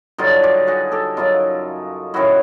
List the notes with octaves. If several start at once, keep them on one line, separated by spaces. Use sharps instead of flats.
G2 D3 F#3 D#4 F4
F4 G4
F#4 G#4
G4 A4
F#2 C#3 F#3 D#4 F4
F#2 D#3 F#3 E4 F#4